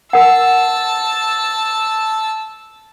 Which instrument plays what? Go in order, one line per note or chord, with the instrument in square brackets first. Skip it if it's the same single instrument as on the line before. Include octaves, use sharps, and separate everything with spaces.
[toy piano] A#4 F#5 [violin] A5 E6